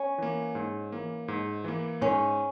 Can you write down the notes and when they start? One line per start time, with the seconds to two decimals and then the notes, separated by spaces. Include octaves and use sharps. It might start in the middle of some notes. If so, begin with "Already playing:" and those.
Already playing: C#4
0.18 E3 A#3
0.55 G#2
0.92 E3 A#3
1.28 G#2
1.64 E3 A#3
2.01 G#2 C#4